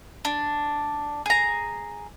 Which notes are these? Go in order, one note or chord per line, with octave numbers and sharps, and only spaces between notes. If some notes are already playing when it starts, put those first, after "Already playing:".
D4
G#4 A#5